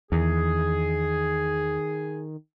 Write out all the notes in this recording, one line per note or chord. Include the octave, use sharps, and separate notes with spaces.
E2 D#3 G#4